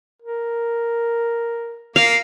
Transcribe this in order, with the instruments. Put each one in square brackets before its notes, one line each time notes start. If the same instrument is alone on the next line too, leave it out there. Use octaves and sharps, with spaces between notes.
[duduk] A#4
[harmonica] A#3 [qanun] F5